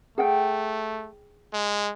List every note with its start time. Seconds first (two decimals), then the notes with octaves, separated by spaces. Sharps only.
0.18 A3 G#4 F#5 G5
1.54 G#3